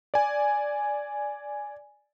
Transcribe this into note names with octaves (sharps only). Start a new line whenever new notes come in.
D5 G#5